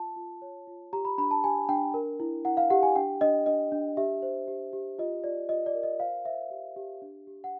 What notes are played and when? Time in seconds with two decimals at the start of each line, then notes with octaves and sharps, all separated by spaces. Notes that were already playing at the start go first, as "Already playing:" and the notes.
Already playing: F4 A5
0.16 F4
0.42 C#5
0.67 F4
0.93 G4 A#5
1.05 B5
1.18 D4 B5
1.31 A5
1.44 G4 G#5
1.69 D4 G5
1.94 A#4
2.20 E4
2.45 E4 F#5
2.57 F5
2.70 G4 F#5
2.83 G#5
2.96 D4 G5
3.21 D4 D#5
3.46 D4 D#5
3.72 D4
3.97 G4 E5
4.22 C5
4.48 G4
4.73 G4
4.99 F4 D#5
5.24 F4 D5
5.49 F4 D#5
5.66 D5
5.74 A#4
5.83 D#5
6.00 C5 F5
6.25 C5 E5
6.51 G4
6.76 G4
7.02 D4
7.27 G4
7.44 F#5